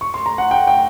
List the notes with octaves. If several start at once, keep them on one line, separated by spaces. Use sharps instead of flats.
C#6
C6
A#5
F#5
G5
G5